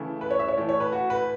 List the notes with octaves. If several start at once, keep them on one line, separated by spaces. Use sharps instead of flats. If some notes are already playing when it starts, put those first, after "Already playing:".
Already playing: C#3 E3 A3
B4
C#5
E5
C#5
A2 E3 A3
C#5
B4
F#4
B4